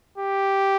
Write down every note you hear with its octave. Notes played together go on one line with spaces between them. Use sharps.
G4